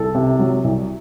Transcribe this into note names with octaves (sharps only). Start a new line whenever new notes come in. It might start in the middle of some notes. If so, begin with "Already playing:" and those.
Already playing: C2 A4
C3
F#3
C2